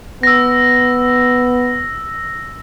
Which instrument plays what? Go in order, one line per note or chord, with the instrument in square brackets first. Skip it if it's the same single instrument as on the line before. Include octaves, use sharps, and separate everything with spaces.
[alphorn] B3 [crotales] E6 A#6